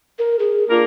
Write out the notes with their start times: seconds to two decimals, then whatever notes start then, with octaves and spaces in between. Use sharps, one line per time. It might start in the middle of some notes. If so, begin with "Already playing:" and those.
0.19 A#4
0.39 G#4
0.70 A#3 D4 F4 A#4